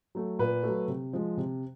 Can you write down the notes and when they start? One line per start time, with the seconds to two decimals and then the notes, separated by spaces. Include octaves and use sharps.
0.15 F#3 A3
0.39 A#2 B4
0.63 A3
0.69 F#3
0.88 C3
1.13 F3 G#3
1.37 C3